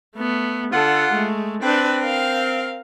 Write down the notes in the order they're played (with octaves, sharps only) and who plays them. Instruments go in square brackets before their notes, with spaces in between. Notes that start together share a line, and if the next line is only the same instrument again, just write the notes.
[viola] A3 B3
[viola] D3 A4 [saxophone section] F4 F#5
[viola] G#3 A3
[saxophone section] C4 [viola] D4 B4
[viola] A#4 F5